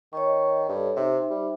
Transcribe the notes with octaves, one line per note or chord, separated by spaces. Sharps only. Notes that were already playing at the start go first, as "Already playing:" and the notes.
D#3 C#5 D#5 C#6
G2 A4 C#5 D#5
C3 D#4 C5 E5
G3